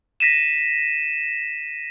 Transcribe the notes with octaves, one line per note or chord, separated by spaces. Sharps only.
A#6 B6 D#7 E7